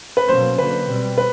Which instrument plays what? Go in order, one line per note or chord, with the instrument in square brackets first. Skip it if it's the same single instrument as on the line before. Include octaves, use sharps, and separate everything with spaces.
[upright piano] B4
[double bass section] B2 F#3 A#3 C#4 [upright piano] C5
[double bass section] D3 F#3 A#3 [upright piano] B4
[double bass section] B2 G3 C4
[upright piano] B4